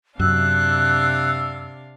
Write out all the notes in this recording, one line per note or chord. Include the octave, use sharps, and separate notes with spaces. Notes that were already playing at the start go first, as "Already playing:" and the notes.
F#2 C3 D4 F5 E6 F#6